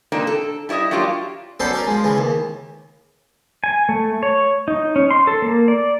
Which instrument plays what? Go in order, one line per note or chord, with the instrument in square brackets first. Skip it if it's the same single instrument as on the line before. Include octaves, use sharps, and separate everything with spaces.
[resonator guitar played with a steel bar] A#2 A#3 C4 D4 D#4
A4
G3 E4 C#5 D#5 E5
F#3 G3 A#3 D4 F4 G4
[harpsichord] F#3 B3 C#4 A4 C5 D5
C#4 A#4 D5
F3 G#3
C#3 E3
D#2
[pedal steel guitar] G#5
A3
C#5
D#4
C#4
C6
A4
A#3
D5